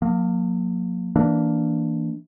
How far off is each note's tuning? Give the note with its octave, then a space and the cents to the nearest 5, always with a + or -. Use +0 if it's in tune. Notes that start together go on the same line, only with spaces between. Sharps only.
F#3 -45 A#3 +0
E3 -10 A#3 +0 D4 +0